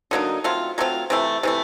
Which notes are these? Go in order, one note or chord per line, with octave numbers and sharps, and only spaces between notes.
D3 F#3 A#3 D#4
F#3 A3 C4 F4
F#3 A3 C4 F4
C3 E3 A3
C3 E3 A3